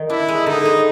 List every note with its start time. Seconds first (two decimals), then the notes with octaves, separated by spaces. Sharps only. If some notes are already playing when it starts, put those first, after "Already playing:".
Already playing: D#3
0.10 D4 E4
0.28 G#3
0.46 D3 D#4
0.65 G#3